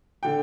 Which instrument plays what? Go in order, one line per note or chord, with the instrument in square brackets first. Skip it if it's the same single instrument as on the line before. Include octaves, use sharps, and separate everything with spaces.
[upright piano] D3 G5